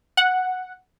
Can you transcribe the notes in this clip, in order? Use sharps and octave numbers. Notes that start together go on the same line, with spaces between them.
F#5